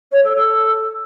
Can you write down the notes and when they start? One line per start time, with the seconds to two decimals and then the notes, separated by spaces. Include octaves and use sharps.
0.12 C#5
0.24 A4
0.35 A4